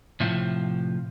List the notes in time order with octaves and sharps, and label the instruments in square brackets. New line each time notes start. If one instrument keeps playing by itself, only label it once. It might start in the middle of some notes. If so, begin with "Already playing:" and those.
[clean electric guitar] A2 C3 F3